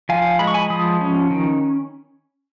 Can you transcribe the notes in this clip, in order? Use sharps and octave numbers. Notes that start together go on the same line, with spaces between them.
F3 F5 G#5
G#3 B5
C#6
G#5 B5
F3 B5 D#6
C#4
D#3